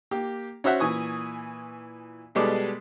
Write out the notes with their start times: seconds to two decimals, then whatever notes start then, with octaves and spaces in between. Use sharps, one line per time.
0.11 A#3 G4
0.64 C#4 F#4 C5 E5 F#5
0.80 A#2 E3 G#5 C#6 D#6
2.35 B2 G3 G#3 B3 A4 D5